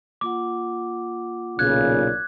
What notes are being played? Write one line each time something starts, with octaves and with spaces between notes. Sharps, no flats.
A#3 F4 F#5 D6
B1 A#2 C#3 F5 F#6 G#6